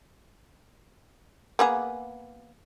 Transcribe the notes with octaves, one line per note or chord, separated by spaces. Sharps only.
A#3 B3 G#4